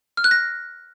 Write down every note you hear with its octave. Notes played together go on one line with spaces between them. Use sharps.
F6
F#6
A#6